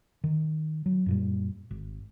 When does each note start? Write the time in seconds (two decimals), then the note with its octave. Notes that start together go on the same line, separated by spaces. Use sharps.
0.24 D#3
0.86 F#3
1.06 F#2 A#2 G3
1.71 G#1